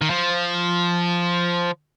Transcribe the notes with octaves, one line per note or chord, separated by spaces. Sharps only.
D#3
F3